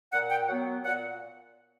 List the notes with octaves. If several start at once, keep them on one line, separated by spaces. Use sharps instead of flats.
A#2 F#5
G5
F#3 B3 F#5
A#2 F#5